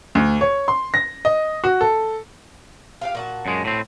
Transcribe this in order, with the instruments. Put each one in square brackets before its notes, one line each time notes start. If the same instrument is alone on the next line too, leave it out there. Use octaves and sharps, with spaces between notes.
[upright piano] D2
C#5
C6
A#6
D#5
F#4
A4
[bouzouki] F4 G4 F5
A#2 F#4 A5
[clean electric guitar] F#2 G#3
A2 C4